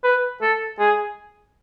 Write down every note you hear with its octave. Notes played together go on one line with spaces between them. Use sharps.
B4
A4
G#4